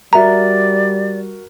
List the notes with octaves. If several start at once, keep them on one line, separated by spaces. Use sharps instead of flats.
G3 F#4 A#4 D5 E5 A#5